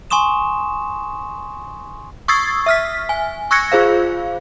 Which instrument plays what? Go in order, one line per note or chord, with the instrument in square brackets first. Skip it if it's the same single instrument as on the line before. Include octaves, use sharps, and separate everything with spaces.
[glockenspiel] G#5 C6 C#6 D#6 E7
[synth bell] C#6 D#6 E6 G#6 A6 C7
E5 F6 B6
G#5
C#6 E6 F#6 G#6 A#6 C#7
F4 G#4 C5 F5